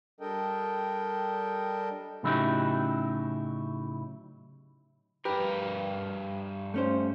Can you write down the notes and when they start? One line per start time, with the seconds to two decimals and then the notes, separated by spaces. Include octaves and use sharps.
0.21 G3 D4 A4 A#4 D#5 G5
2.23 A2 C#3 F#3 D#4 E4 G4
5.25 G2 G4 A#4 B4
6.74 A3 C#4 C5